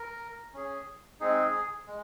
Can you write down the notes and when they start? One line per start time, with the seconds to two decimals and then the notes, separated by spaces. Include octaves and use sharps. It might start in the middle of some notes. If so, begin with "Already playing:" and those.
Already playing: A#4
0.54 C#4 G#4
1.20 G#3 C4 D#4 G#4
1.87 G#3